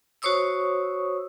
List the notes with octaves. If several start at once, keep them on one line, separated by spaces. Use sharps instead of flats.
F#4 C5 C#5 C#6 D#6 E6